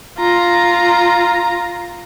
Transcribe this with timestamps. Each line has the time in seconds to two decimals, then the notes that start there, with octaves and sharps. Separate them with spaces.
0.19 F4 A#5